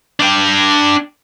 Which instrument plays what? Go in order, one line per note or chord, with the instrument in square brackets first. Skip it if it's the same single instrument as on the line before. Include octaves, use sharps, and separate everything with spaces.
[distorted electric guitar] D4 G5